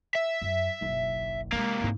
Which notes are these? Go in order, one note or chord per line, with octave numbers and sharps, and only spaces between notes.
E5
F#2
F#1 B1
C3 G#3 A#3 D4
G#2 E4